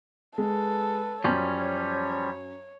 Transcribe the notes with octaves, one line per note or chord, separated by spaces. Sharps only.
G#3 A4 B4
F#2 F3 G3 C#4 C#5